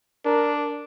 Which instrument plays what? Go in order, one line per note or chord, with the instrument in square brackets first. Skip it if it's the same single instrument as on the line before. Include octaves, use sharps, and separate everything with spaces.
[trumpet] D4 [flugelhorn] A#4